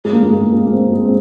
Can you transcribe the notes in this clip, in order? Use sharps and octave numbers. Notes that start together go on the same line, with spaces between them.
G#3
A#3
A#3
G#3
A#3
A#3
C4
G#3
C4